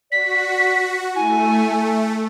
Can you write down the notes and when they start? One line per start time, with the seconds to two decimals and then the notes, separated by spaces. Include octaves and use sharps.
0.12 F#4 D5 B6
1.15 A3 E4 G#5